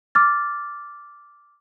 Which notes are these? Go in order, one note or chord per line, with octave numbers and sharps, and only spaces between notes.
D6 F6 A6